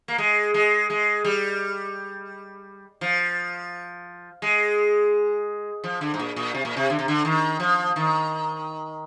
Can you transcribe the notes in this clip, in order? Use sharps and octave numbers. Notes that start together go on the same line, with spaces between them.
A#3
G#3
G#3
G#3
G3
F3
G#3
F3
D3
G#2
A#2
A#2
C3
A#2
C3
D3
C3
D3
D#3
F3
D#3